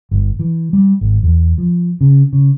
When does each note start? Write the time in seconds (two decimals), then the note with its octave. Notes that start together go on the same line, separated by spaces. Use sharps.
0.11 G1
0.39 E3
0.73 G3
1.01 G#1
1.23 E2
1.58 F3
2.01 C#3
2.33 C#3